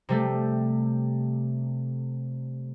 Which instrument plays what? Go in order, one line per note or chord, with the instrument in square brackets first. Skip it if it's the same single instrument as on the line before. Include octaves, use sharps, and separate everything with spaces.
[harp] C3 G3 A3